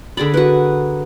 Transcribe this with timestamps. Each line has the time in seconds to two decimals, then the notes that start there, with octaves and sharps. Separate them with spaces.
0.17 D3 G#4 D5 B5
0.34 F#4 A#4 B4